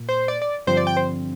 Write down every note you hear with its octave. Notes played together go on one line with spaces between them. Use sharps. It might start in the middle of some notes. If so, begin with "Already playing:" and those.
Already playing: A#2
C5
D5
D5
G2 D3 F3 C4 C5
D5
G5
C5